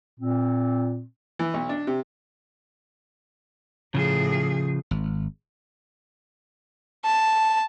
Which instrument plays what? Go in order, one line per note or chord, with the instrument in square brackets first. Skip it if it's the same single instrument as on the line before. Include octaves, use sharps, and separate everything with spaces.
[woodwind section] A#2 C4
[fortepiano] E3
B1
D4
C3
[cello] A2 G#4 [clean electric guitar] C#3 F3
[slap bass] G#1
[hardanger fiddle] A5